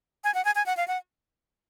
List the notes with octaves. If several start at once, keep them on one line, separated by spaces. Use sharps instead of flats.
G#5
F#5
G#5
G#5
F#5
F5
F#5